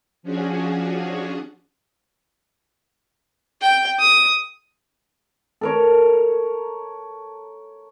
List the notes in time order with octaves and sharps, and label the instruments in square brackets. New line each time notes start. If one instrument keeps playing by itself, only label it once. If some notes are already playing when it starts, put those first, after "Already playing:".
[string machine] F3 C#4 D4 F#4 G#4
[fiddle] G5
D#6
[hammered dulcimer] A4 A#4 C#5